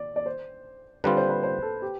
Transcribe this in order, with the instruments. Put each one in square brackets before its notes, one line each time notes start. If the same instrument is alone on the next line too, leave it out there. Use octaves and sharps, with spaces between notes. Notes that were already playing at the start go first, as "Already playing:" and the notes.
Already playing: [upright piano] D5
D5
C5
[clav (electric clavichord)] D3 G3 C4 F4 [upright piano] B4
[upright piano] C5
B4
C5
A4
G4